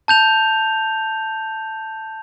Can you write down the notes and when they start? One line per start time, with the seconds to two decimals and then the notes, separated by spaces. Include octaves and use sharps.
0.08 A5 G6 F7